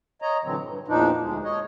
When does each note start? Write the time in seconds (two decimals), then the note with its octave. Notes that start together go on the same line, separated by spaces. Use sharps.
0.22 C#5 D#5 A#5
0.44 A#2 D3 E3 F#3 C4
0.60 G2
0.88 E2 A#2 F3 D4 D#4
1.21 D2 G#3
1.44 C#5 D#5